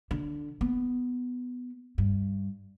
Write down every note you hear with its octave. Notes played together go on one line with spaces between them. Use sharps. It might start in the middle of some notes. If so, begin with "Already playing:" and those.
D3
B3
G2